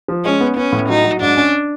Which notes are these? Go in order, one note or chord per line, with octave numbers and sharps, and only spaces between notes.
F3
G#3 C#4
B3
B3 C#4
A2
F#3 D#4
F#3
G#2 D4
C#4